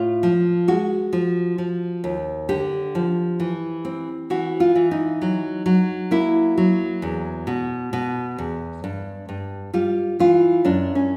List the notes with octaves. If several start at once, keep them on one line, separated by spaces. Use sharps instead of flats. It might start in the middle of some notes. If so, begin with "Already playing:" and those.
Already playing: A2 F4
F3
G#3 F#4
F3
F3
D#2
D3 G4
F3
E3
C4
E3 F#4
F4
E3
D#4
F#3
F#3
A#3 E4
F#3
E2
B2
B2
E2
G2
G2
G3 F4
E3 F4
F#2 D4
C#4